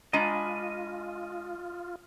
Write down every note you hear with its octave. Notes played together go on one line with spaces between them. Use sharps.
G#3 D4 F4 D#5 G#5 A#5 B5